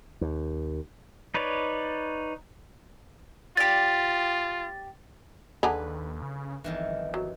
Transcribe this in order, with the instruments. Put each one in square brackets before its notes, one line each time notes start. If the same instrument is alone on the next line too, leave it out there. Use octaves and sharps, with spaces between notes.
[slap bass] D#2
[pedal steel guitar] D#4 B4 C#5 D5
[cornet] F4 [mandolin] G4 D5 [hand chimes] A6
[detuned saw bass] D#2 [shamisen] D3 G#4 A#5 [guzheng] B4
[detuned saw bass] C#3
[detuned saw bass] G1 [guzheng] F2 D#3 E3
[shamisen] F#3